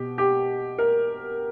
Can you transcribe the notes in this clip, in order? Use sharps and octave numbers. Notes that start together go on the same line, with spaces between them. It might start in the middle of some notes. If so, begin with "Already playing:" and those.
Already playing: B2 G4
G4
A#4